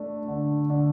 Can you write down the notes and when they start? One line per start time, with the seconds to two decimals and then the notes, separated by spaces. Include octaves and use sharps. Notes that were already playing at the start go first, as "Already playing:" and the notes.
Already playing: A3 D4
0.28 D3
0.70 D3